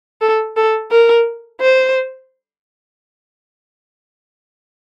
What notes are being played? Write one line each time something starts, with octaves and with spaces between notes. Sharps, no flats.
A4
A4
A#4
C5